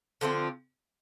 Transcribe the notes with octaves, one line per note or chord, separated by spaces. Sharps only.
D3 F3 C4 F4